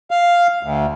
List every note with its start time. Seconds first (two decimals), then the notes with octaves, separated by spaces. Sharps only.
0.11 F5
0.63 D2